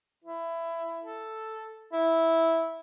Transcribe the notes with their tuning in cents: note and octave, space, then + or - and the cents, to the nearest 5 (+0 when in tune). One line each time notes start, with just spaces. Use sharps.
E4 +15
A4 +0
E4 -10